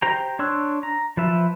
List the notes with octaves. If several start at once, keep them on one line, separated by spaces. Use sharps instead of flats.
G4 C5 G5 A#5
D4 C#5 C6 E6 F#6
A#5
F3 B4 E5